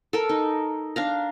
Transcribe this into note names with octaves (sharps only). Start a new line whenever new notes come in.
A4 A#4
D#4
D4 F5 A#5